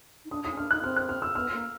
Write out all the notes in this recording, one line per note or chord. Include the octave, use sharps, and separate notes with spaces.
D#4
D4 D#6
D#4 D#6
C#4
D4 F6
D#4 F#6
C4 F6
F#6
F6
E6
B3 F6
A#3